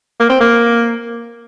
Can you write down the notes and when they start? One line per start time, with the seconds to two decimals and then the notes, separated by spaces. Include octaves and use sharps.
0.20 A#3
0.29 C4
0.40 A#3